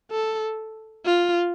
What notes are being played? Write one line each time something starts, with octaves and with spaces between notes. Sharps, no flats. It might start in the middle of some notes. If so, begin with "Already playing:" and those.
A4
F4